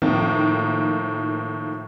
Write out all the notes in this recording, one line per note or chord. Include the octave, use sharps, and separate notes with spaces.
A2 D#3 F3 A#3